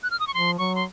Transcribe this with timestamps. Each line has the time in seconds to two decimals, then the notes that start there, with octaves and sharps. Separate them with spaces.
0.03 F#6
0.11 F6
0.20 D#6
0.27 C#6
0.34 F3 C6
0.58 F#3 C#6
0.75 C6